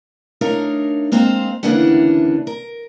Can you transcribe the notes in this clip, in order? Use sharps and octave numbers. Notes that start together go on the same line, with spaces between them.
A3 D4 D#4 A#4 C#5 F5
G#3 A#3 C4 C5 D#5 F5
D2 C#3 E3 A#3 D4 F#5
A#4